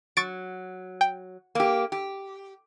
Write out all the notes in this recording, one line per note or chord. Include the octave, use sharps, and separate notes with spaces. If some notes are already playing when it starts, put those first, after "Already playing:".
F#3 C#6 A6 D7
G5
A#3 G4
G4